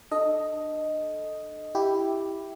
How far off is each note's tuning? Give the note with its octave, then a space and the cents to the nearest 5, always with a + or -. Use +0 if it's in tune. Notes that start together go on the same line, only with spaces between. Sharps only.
D4 +30 A4 +0 D#5 +0
E4 +0 G4 +0